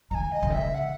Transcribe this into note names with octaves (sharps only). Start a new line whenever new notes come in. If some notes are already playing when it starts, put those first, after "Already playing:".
D#3 G#5 A#5
D#5
C#3
D#3
C#3 E5
F#5